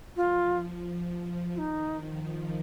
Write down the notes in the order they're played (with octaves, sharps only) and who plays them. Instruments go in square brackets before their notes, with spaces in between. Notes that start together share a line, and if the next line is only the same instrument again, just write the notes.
[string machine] F3 [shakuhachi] F4
[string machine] D#3 [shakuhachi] F4
[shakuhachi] D#4
[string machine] F3
F3